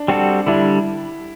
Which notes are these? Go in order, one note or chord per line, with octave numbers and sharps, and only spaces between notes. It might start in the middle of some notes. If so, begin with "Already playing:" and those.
Already playing: D4
G3 C4 F#4 A4
D3 G3 D4 E4